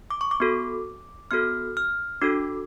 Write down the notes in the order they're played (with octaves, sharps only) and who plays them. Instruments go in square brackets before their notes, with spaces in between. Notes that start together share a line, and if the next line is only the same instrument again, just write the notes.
[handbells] D6
C#6
D6
B3 F#4 A4
B3 F#4 A4 F6
F6
D4 F#4 A4 D6